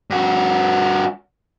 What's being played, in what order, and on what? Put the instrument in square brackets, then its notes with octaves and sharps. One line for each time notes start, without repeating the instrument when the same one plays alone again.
[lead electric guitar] G2 F#4